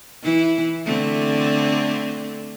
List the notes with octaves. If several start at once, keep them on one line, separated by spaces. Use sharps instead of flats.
E3 E4
D3 A3 C4